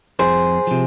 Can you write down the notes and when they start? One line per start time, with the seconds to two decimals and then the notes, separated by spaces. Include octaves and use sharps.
0.19 F2 G#4 C5
0.67 C3 F3